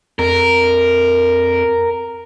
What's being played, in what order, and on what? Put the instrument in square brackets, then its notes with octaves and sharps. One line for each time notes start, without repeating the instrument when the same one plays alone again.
[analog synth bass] F2 [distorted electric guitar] A#4